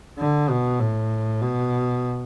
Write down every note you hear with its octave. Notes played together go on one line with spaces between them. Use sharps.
D3
B2
A2
B2